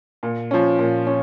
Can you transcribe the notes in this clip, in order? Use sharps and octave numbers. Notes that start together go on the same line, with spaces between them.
A#2
F3 C#4
A#2
C#4